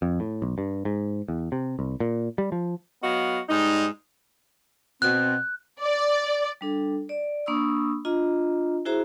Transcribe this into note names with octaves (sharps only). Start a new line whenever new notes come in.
F2
A2
B1
G2
G#2
E2
C3
C2
A#2
G3
F3
F#3 B3 F#4 D#5 F5
G#2 G3 D#4
B2 C4 F#6
D5
G3 D4 A4
D5
A#3 D4 B5 C#6 D#6 E6
D4 F4 D#5 A#5
E4 F#4 G#4 C5 E5 A#5